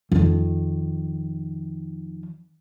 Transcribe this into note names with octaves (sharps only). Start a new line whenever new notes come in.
F2 D#3